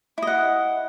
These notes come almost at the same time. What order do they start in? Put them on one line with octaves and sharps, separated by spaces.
E4 D#5 F#5